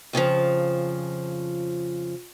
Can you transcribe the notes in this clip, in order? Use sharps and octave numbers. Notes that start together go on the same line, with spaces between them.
F2 C#3 E3 F3